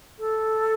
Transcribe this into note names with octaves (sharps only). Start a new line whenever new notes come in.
A4